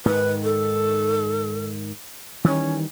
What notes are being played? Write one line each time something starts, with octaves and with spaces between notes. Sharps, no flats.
G#2 D#3 B4
A4
D#3 E3 G3 C#4